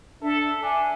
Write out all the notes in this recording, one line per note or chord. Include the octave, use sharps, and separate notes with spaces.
D4 A4 E5
D4 E5 G#5